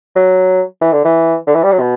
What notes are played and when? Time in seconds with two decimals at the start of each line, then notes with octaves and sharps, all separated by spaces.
0.16 F#3
0.81 E3
0.92 D3
1.05 E3
1.47 D3
1.54 E3
1.63 G3
1.72 F#3
1.80 B2